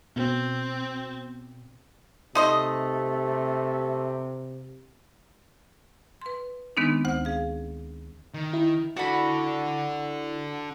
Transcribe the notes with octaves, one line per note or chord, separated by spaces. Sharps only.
B2 C4
C3 A3 D#4 C5 D#5
B4 C6
D#3 G#3 B3 C4 D4 D#4
D2 C5 F#5
G#4 F5
D#3
E4
D4 F#4 A4 B5